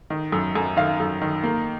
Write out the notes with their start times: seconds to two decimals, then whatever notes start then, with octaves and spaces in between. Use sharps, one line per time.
0.10 D#3
0.32 F#2
0.55 F#2
0.77 D#3 F5
1.00 F#2
1.21 D#3
1.44 A#3